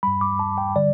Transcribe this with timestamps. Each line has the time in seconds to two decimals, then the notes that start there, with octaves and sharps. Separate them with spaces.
0.03 G2 G3 B5
0.21 D6
0.39 A5
0.58 G5
0.76 D3 G3 D5